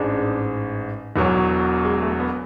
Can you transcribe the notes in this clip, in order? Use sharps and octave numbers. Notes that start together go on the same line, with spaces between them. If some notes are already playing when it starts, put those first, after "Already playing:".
Already playing: A1 G#2 G#3 D4
E1 E2 B2 F#3
G#3
A3
B3